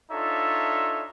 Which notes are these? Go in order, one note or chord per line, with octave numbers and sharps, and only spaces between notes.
D4 D#4 F4 A4 C#5 E5